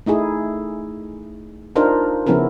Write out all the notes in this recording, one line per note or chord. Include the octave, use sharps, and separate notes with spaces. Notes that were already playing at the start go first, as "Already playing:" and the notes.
A3 D#4 E4 G#4
D4 D#4 F4 A#4 C5
C#3 F3 B3 C#4 E4 A#4